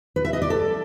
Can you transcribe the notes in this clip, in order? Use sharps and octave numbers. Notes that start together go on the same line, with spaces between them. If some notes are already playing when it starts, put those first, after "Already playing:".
B4
E5
D#5
D5
A4